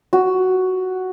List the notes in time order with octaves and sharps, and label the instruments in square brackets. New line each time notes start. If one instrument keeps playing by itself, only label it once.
[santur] F#4